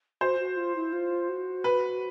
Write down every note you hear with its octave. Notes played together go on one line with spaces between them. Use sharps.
F#4 C5
F#4
F4
E4
F4
F#4
B4